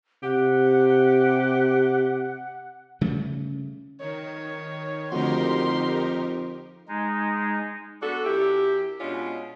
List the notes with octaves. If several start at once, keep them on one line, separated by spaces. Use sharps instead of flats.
C3 G4 F#5
C#3 G3 A3
D#3 C#5
F2 D3 A3 D#4 F#4 G4 A#4 C6
G#3 D#4
B3 D4 F#4 A4
F#2 E4 G4
B2 G#3 C#4 D4 F4